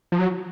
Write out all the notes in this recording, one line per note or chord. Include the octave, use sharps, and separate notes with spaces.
F3
F#3